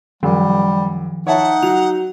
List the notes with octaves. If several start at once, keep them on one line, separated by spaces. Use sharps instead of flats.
F#2 D#3 F3 G3
D#4 C#5 E5 F#5 A5
F#3 F7